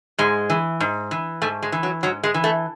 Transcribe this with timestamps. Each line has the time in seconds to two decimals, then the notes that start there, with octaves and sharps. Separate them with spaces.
0.18 G#2 G#3
0.50 E3
0.80 G#2
1.11 E3
1.42 G#2 A3
1.62 G#3
1.72 E3
1.83 F#3
2.03 G#2 F#3
2.23 G#3
2.34 E3
2.44 A3